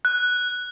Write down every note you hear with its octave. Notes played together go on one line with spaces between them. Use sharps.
F#6